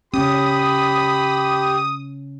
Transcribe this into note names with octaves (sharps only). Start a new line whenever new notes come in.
C#3 C#4 G4 B5 D#6